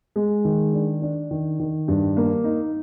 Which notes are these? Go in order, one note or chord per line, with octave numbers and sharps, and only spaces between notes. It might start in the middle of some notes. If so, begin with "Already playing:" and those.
G#3
D#3
D4
D4
D#3
D#3
G2
A#3
D#4